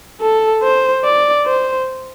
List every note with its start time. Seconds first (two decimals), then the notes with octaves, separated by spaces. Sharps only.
0.21 A4
0.63 C5
1.05 D5
1.47 C5